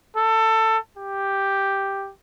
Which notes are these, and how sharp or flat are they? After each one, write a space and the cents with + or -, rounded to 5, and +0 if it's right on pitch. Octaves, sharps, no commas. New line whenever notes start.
A4 +20
G4 +0